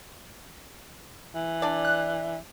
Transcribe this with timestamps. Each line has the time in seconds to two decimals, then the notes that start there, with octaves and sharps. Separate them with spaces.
1.35 E3
1.62 D4 D5
1.85 F#6